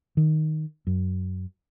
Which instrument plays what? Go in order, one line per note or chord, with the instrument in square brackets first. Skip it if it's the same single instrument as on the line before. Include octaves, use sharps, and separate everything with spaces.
[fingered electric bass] D#3
F#2